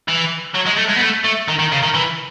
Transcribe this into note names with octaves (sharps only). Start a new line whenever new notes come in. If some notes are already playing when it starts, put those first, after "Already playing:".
E3
F#3
G#3
A3
G#3
B3
A3
A3
D#3
D#3
C#3
D#3
E3